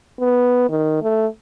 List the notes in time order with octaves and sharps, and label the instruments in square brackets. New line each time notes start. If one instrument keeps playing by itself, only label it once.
[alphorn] B3
D#3
A3